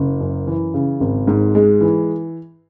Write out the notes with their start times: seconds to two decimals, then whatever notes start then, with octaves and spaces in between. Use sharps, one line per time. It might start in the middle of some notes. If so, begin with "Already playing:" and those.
Already playing: F#1
0.21 F#2
0.47 E3
0.74 C#3
1.01 G#1
1.27 G#2
1.55 G#3
1.81 E3